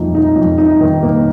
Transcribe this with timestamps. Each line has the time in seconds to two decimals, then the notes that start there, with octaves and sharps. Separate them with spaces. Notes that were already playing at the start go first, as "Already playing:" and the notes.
Already playing: F2 A#3 D#4
0.15 D#4
0.36 F2
0.58 D#4
0.81 D#3
1.03 A#3